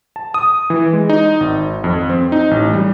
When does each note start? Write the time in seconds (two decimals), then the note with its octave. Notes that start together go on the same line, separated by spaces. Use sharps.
0.16 A5
0.34 D#6
0.70 E3
0.93 G#3
1.09 D#4
1.41 G#1
1.84 F2
2.10 C4
2.32 D#4
2.51 A1
2.73 G3